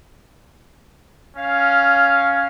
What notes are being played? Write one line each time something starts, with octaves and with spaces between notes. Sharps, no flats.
C#4 F5